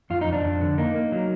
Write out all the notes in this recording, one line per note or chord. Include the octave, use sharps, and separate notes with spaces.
F2 F4
D#4
F2
D4
F2
D3
A#3 D#4
A#3
F#3